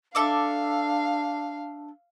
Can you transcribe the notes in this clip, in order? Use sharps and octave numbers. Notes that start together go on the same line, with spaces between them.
D4 A4 E5 F5 D6